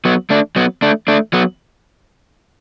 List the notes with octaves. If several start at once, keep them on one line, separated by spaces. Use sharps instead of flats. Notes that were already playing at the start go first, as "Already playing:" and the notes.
F#3 B3
A3 D4
F#3 B3
A3 D4
A3 D4
F#3 B3